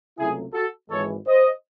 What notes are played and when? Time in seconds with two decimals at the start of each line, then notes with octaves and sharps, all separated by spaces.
0.17 C#2 C3 F#3 A3 E4 G#4
0.54 F#4 A4
0.89 G#1 G#2 E3 G#3 A4 C#5
1.25 C5 D#5